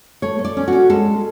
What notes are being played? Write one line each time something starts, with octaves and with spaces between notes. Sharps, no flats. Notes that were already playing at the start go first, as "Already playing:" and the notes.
A3 C#5
A3
D5
C#4
C#4 F#4
G#3 A4